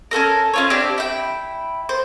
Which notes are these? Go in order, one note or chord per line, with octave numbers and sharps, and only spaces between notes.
C#4 F#4 A4 A#4
C#4 F4 C#5
C4 D4 G4
E4 G5
C5